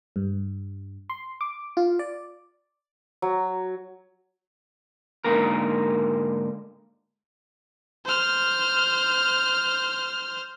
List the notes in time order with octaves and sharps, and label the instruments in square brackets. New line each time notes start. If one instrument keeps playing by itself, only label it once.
[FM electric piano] G2
C6
D6
F4
D5
[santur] F#3
[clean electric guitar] G#2 D3 A#3 A#4
[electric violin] C5 F6